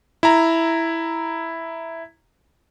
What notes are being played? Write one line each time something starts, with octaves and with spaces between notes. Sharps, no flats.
E4 A#5